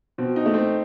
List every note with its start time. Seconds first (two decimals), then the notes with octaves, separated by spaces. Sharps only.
0.18 B2 C4
0.36 D#4
0.46 A3
0.54 C4